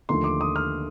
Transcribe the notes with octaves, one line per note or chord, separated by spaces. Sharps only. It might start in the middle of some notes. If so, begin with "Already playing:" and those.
D#2 D3 F3 A3 C6
D6
D#6
F6